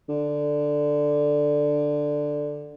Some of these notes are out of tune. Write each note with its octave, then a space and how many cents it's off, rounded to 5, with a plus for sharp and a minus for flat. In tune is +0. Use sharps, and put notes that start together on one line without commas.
D3 +5